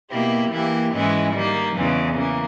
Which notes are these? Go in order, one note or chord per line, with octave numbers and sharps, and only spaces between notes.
B2 A#3 E4 G4
E3 A#3 E4 G4
G#2 E3 G#3 C#4 E4
D#3 G3 A#3 D#4
E2 C#3 E3 G#3
C#3 E3 A#3